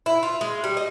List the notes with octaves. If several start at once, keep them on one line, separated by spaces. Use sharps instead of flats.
E4
F4
G#3
G3
D#5